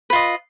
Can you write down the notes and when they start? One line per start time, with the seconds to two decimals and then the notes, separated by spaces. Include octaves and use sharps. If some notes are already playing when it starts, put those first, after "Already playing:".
0.10 B4
0.13 F4
0.15 D#5